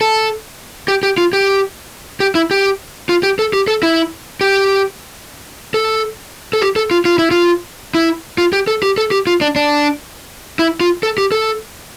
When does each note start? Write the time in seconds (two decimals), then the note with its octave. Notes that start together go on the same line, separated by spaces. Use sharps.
0.01 A4
0.88 G4
1.03 G4
1.18 F4
1.33 G4
2.20 G4
2.35 E4
2.51 G4
3.09 F4
3.23 G4
3.39 A4
3.53 G4
3.68 A4
3.83 E4
4.41 G4
5.74 A4
6.53 A4
6.61 G4
6.76 A4
6.91 F4
7.05 F4
7.19 E4
7.31 F4
7.95 E4
8.38 F4
8.53 G4
8.67 A4
8.83 G4
8.98 A4
9.11 G4
9.27 F4
9.41 D4
9.56 D4
10.59 E4
10.81 F4
11.03 A4
11.18 G4
11.32 A4